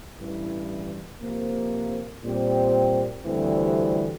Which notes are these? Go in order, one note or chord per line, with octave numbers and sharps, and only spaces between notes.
A1 G2 E3
C3 F3 A#3
A#2 G3 C4 G4
D2 C3 E3 G3 C4